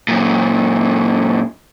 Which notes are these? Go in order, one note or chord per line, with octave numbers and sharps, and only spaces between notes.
F#2 A#2